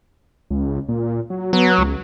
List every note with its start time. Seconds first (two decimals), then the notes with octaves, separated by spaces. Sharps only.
0.50 C#2
0.89 A#2
1.30 F#3
1.53 F#3 B3
1.78 C#2